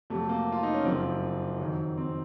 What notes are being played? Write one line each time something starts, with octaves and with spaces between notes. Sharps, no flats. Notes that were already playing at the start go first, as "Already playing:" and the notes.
F2 C3 F#3 A3
A#3
F4
D#4
C#4
F#1 F#2 F3 C4
F2 D#3 F#3
C4